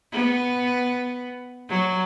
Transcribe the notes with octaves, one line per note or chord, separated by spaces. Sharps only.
B3
F#3